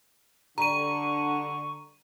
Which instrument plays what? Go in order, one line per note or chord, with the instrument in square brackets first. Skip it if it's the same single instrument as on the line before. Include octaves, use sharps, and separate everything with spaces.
[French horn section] D3 [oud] G3 [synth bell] A#5 D#7 [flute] C#6